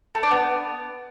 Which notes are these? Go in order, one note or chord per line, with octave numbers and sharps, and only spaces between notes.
A3
D4
B3